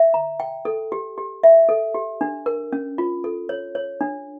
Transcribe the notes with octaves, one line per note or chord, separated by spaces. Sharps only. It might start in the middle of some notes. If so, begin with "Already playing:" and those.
Already playing: E5
A#5
G5
A4
G4
G4
E5
A4
G4
D4
A#4
C#4
F4
A4
C#5
C#5
D4